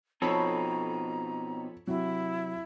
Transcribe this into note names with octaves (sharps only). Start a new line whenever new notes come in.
B2 F3 C4 D#4 A4 C#5 A#5 B5
C3 F#3 E4